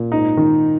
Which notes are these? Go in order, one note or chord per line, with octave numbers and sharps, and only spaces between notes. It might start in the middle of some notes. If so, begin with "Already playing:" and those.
Already playing: A#2
G#2 D#4
D#3